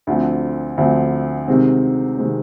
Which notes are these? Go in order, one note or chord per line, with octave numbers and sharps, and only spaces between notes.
D2 D3 F3 C4
D2 D3 F3 C4
C3 D#3 G#3 C4
C3 D#3 G#3 C4